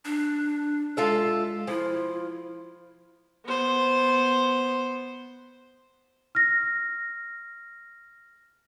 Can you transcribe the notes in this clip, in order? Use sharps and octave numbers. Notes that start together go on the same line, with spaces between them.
D4
G#3 F4 A4 E5
F3 E4
B3 C5
F6 A#6